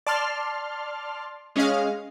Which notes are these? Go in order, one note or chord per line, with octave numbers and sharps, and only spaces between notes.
D5 A5 C6 F6
G#3 C#4 G#4 D#5 F5